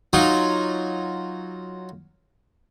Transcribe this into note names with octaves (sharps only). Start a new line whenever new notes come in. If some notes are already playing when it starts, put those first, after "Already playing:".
F#3 D#4 F4